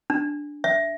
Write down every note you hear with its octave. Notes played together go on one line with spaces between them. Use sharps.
D4
E5